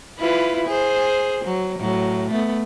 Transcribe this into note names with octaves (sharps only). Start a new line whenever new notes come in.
E4 F4 B4
G#4 C5
F#3
A2 F#3
A3 B3